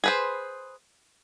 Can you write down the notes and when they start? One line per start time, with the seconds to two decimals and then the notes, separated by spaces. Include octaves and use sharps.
0.04 G#4 B4 C5